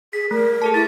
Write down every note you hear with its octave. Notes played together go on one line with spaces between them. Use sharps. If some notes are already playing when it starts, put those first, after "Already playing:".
G#4 B6
A3 A#4
G#4 A4 A5
E4 A4 A6